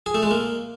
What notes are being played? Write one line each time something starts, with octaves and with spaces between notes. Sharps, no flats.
G#4
A3
G#3
A#3